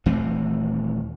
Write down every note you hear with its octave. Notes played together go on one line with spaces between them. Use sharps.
D#1 E3 A3 C4